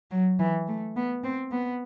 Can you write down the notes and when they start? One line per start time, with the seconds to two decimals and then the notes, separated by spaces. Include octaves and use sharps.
0.11 F#3
0.39 E3
0.68 A3
0.96 B3
1.24 C4
1.52 B3